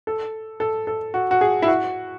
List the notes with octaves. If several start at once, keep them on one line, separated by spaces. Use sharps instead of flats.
A4
A4
A4
F#4
F#4
G#4
E4
F#4